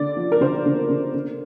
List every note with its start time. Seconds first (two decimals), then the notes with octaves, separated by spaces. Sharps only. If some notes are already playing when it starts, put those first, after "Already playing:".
Already playing: D3 D5
0.17 F3
0.32 A#4
0.41 D3 C5
0.65 D3
0.90 D3
1.14 D3